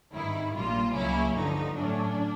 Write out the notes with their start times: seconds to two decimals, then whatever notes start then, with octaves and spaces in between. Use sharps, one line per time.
0.14 G#1 G2 D#3 E4
0.54 A#1 A#2 G3 A#3 F4
0.95 C#2 C#3 F#3 A#3 C#4 E4
1.35 G1 G2 D3 F3 D#4
1.76 A2 F#3 A3 C#4 D4